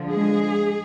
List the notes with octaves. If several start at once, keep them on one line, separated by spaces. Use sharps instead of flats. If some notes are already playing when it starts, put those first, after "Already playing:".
Already playing: D3 F3
G#3 G#4